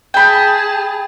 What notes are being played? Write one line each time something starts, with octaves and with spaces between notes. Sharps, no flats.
G#4 G5 A5 B5